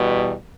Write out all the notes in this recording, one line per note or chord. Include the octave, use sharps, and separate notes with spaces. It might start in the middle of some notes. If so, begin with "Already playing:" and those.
Already playing: E2 B2 G3